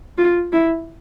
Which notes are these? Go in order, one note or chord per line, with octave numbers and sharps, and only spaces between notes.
F4
E4